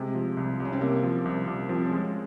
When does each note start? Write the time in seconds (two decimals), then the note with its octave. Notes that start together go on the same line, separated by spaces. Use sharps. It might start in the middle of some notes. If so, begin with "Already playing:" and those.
Already playing: C3 G#3
0.15 F3
0.37 C2
0.60 C2
0.65 C#4
0.73 C4
0.81 C3 A#3
1.03 F3
1.25 C2
1.47 C2
1.69 F3 C4
1.85 C#4
1.91 G#3
1.98 C4